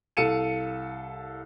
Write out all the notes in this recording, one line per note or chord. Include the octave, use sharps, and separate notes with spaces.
C2 A4 F5 C#7 D#7 E7